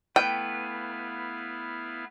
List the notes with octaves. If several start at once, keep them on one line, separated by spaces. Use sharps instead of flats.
A3 B3 E4 B4 F5 G5